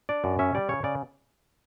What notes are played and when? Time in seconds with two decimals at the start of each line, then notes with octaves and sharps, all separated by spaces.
0.09 D4 D5
0.24 F#2
0.39 C#4 E5
0.55 G3 D5
0.69 C#3 C#5
0.84 C#3 D5